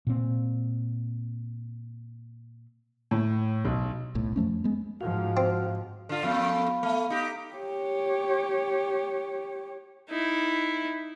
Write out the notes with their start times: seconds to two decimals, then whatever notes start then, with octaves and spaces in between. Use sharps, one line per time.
0.07 A#2 C4
3.11 A2
3.65 B1
4.14 D#1 B1 A2
4.36 F2 F3 A3 C#4
4.64 G#3 B3
5.01 G#2 F3 F#4 F5
5.37 C4
6.09 D3 F4
6.23 F2 A3 B3 F5 B5
6.83 A3
7.10 D#4 G4
7.54 G4 C#5
10.10 D#4 E4